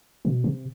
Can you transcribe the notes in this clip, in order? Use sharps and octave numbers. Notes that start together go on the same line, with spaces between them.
B2
C3